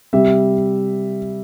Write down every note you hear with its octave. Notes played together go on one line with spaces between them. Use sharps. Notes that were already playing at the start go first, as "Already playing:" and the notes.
C3 G3 E5